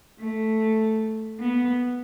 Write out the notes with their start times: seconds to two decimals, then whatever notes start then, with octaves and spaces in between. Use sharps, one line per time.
0.19 A3
1.40 B3